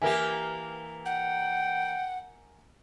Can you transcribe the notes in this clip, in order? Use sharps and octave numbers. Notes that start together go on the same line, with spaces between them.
E3 A#3 G4 A#4 E5 G#5
F#5 G5